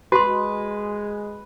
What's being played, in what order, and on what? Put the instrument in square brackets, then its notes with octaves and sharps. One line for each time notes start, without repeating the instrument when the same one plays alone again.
[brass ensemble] G#3 [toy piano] F#4 C6 [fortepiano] B4